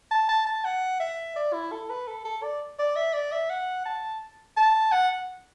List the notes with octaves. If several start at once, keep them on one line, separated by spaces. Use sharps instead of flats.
A5
A5
A5
F#5
E5
D5
E4
A4
B4
A4
A4
D5
D5
E5
D5
E5
F#5
A5
A5
F#5